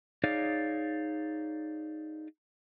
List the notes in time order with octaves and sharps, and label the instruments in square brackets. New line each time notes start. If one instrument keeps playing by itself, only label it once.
[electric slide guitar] D#4 G#4 C#5 D5 F5